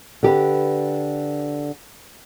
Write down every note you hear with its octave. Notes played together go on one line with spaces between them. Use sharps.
D3 G4 B4